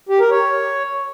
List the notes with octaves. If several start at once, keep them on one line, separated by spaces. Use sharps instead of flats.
G4
A#4
C#5